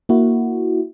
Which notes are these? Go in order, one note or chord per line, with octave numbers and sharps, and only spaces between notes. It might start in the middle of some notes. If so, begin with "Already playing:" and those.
A#3 E4 F#4